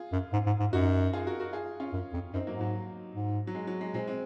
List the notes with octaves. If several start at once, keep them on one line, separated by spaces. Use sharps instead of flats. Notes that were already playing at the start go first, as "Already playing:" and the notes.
Already playing: F4 G#4
F#2
G#2
G#2
G#2
F#2 D#4 F#4
F4 G#4
F#4 A#4
F#4 A#4
F4 G#4
C#4 F4
F#2
F2
F#2 C4 D#4
F#3 A#3
G#2
F#3
G#2
F#3
G#3
F#3
G#3
A#2 G#3 C4
G#3 C4